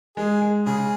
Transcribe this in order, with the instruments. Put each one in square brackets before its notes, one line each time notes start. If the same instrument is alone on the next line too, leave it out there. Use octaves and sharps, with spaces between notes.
[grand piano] G#3 [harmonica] G#4
[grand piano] G#3
[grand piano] C#3 [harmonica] G#4